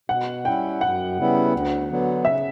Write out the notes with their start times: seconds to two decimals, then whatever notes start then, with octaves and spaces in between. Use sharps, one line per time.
0.09 B2 F#5
0.45 G3 C#4 E4 G5
0.81 F#2 F#5
1.17 C#3 G3 B3 E4
1.53 D2
1.89 D3 F#3 B3
2.25 C#3 E5